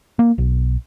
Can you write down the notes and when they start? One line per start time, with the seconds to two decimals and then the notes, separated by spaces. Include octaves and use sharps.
0.19 A#3
0.38 B1